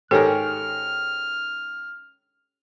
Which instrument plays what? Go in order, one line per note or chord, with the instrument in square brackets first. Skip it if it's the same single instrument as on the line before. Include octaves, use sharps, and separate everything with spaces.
[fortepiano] G#2 D#3 A#4 [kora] C#4 G4 [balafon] A4 [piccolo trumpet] F6